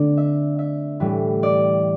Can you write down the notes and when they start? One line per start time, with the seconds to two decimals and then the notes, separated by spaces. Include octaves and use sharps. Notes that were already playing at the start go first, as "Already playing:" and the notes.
Already playing: D3 A3 C4 D5
0.17 E5
0.59 E5
1.00 A2 E3 G3
1.43 D5